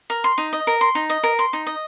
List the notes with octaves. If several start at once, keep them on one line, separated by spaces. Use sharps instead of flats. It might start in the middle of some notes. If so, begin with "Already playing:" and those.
A#4
C6
D#4
D#5
A#4
C6
D#4
D#5
A#4
C6
D#4
D#5